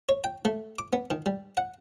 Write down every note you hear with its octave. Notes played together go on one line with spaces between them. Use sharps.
C#5
G5
A3
D6
B3
D#3
G3
F#5